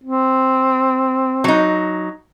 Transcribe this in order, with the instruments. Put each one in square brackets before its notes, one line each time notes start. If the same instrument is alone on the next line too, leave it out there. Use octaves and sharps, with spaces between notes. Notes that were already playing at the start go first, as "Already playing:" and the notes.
[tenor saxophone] C4
[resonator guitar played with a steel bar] F#3 D#4